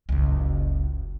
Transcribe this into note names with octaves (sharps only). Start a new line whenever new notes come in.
F#1 C#2